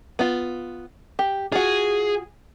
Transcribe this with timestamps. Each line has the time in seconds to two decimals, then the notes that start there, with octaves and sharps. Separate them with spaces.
0.19 B3 F4
1.19 G4
1.52 F4 F#4 G#4